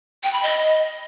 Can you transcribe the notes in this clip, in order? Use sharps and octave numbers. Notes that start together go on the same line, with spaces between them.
G5
B5
D#5